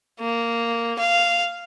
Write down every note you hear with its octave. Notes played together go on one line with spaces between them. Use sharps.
A#3
F5